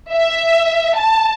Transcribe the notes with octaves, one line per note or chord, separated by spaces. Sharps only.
E5
A5